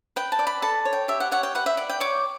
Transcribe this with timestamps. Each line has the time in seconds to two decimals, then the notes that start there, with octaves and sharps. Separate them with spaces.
0.16 B4 G5
0.32 A5
0.39 D5
0.47 B5
0.62 A4 A5
0.85 C#5
0.93 G5
1.08 G4 E5
1.20 F#5
1.31 C#5 F#5
1.43 G5
1.55 B4 F#5
1.66 E5
1.77 D5 F#5
1.90 G5
2.00 C#5 D6